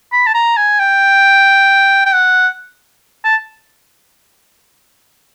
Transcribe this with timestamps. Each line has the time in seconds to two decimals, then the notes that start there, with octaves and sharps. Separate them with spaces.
0.12 B5
0.27 A5
0.34 A#5
0.57 G#5
0.79 G5
2.06 G5
2.13 F#5
3.24 A5